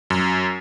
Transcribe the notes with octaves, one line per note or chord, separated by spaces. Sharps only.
F#2